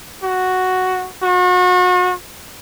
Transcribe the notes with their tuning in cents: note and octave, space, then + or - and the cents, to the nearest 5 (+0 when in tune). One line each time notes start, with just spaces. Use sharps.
F#4 +0
F#4 -35